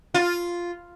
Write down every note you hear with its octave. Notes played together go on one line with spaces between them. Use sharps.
F4